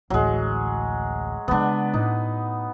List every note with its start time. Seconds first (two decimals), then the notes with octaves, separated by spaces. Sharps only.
0.10 A1 D2 F#3 G#3
1.48 C#3 G#3 B3 D4
1.94 A2 D#4